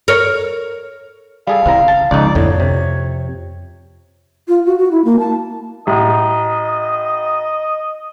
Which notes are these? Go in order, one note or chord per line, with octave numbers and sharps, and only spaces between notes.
A#4 C#5
G3 G#4 A4 F5
C#3 C4 E4 A#5
A5
C#2 F3 D#4 D5
F2 A2 D3 C#5
C3
F4
F#4
F#4
E4
A#3
A5
A1 D#5